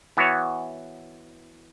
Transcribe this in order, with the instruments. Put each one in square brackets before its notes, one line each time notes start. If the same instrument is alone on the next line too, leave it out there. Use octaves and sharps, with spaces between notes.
[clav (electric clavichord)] E3 B3 F#4 C#5